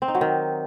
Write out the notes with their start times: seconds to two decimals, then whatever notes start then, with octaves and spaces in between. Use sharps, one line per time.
0.02 C4
0.08 D#4
0.15 F#3
0.21 D#3